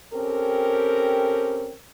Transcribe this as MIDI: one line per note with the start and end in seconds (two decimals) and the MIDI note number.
0.13 1.74 60
0.13 1.74 61
0.13 1.74 67
0.13 1.74 69
0.13 1.74 70